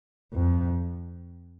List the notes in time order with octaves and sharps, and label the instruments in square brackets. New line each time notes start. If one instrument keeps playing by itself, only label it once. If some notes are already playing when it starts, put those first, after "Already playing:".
[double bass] F2